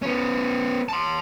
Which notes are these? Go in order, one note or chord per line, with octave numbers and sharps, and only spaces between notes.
B3 C#4
A5 C6